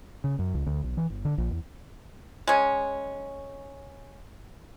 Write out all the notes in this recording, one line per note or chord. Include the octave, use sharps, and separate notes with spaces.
C#3
F#2
C#2
D2
B1
E3
G1
D3
A#1
E2
G#3 C#4